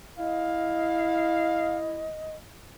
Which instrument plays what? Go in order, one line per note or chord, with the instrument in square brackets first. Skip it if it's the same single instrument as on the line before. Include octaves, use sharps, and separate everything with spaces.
[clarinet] E4 [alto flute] D#5 [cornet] F5